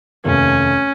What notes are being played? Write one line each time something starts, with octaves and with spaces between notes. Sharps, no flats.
F1 D#2 C#4